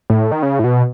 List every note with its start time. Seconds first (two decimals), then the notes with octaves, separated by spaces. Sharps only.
0.10 A2
0.32 D#3
0.43 C#3
0.59 A2
0.64 B2